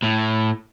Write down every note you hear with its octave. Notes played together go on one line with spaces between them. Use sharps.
A2